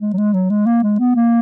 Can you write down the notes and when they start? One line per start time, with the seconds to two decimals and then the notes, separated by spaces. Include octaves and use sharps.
0.01 G#3
0.13 F#3
0.18 G#3
0.34 F#3
0.50 G#3
0.67 A#3
0.83 G#3
0.99 B3
1.16 A#3